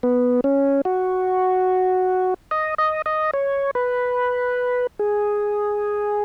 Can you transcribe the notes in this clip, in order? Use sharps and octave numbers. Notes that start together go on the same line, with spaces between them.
B3
C#4
F#4
D#5
D#5
D#5
C#5
B4
G#4